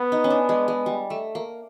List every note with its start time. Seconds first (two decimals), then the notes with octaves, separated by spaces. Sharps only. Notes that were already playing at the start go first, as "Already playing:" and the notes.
Already playing: B3
0.12 D#4
0.24 C#4
0.30 D4
0.49 G#3
0.68 G#3
0.86 G3
1.10 A3
1.35 A#3